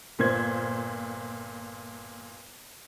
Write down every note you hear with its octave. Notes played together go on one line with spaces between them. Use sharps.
G1 A#2 C5 G#6